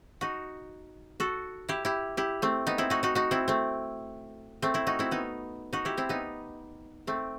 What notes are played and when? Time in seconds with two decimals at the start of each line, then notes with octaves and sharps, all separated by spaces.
0.21 D#4 F#4
1.20 F#4 A4
1.69 E4 G4
1.85 E4 G4
2.17 E4 G4
2.42 A3 C4
2.67 B3 D#4
2.78 C4 E4
2.90 D#4 F#4
3.03 D#4 F#4
3.15 D#4 F#4
3.31 C4 E4
3.48 A3 C4
4.62 A3 C4
4.74 C4 E4
4.87 D#4 F#4
4.99 C4 E4
5.11 B3 D#4
5.73 D#4 F#4
5.85 E4 G4
5.97 C4 E4
6.09 B3 D#4
7.07 A3 C4